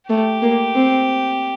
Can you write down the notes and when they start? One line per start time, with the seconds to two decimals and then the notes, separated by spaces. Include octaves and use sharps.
0.09 A3 G4
0.42 A#3
0.74 C4